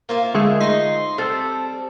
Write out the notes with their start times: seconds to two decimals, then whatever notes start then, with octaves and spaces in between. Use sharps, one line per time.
0.09 A#3 F4 C5 E5
0.34 D3 G#3 A3 G#4
0.60 D#4 C6 A#6
1.18 G3 C4 A4